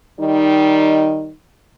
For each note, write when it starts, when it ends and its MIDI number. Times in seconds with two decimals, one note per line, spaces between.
0.20 1.30 51
0.20 1.30 55
0.20 1.30 63